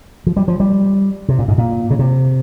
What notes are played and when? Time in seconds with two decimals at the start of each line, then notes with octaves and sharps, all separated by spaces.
0.27 F3
0.37 G3
0.48 F3
0.60 G3
1.29 C3
1.39 A#2
1.48 G#2
1.58 A#2
1.90 C#3
1.99 C3